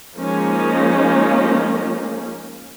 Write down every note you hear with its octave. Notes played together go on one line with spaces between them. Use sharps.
F3 G#3 A#3 C#4 D#4